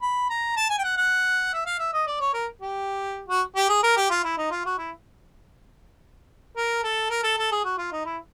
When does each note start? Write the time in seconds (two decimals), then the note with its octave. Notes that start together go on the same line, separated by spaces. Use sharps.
0.02 B5
0.30 A#5
0.57 A5
0.70 G#5
0.78 G5
0.84 F#5
0.97 F#5
1.53 E5
1.66 F5
1.79 E5
1.93 D#5
2.07 D5
2.20 C#5
2.34 A#4
2.61 G4
3.29 F#4
3.56 G4
3.69 G#4
3.83 A#4
3.97 G4
4.10 F4
4.24 E4
4.37 D#4
4.51 F4
4.66 F#4
4.78 E4
6.56 A#4
6.83 A4
7.10 A#4
7.23 A4
7.38 A4
7.52 G#4
7.65 F#4
7.78 F4
7.92 D#4
8.05 E4